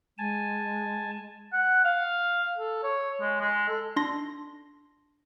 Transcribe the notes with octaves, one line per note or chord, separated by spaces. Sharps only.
G#3 G#5 A5
F#5
F5
A4
C#5
G#3
G#3
A4
D4 C6 A#6